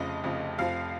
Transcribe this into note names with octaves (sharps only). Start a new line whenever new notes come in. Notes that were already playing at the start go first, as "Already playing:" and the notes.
Already playing: F1 F2 C#3 D#5
F1 F2 C#3
F1 F2 F3 F5